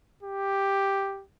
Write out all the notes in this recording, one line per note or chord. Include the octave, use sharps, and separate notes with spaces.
G4